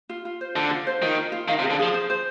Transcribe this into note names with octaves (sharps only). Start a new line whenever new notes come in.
F4
F4
C5
D3 F4
F4
C5
D#3 F4
F4
F4
D#3 F5
C3
G#4
D3
F3 G#4
C5
C5